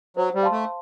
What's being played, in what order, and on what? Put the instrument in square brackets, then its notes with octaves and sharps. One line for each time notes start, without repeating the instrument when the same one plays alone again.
[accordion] F#3 [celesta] C5
[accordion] G3
[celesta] F5 A5 C6
[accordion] A3